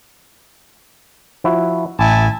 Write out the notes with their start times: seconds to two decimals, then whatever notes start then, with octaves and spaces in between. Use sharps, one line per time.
1.44 F3 E4 F#4
1.99 A1 E4 G#5 A5